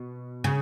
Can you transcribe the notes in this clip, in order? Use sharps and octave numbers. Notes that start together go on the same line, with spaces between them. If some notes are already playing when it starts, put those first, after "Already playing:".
Already playing: B2
C#3